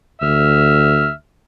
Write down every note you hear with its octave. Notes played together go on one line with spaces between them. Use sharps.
D2 E5 F6